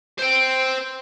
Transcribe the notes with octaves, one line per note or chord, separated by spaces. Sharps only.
C5 G5